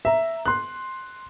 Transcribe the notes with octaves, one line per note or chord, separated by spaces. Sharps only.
E5 A#5
C6 F#6